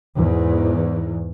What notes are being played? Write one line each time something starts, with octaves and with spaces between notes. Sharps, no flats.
E2 G#2